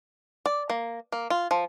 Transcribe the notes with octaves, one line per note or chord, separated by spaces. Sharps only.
D5
A#3
A#3
F4
F3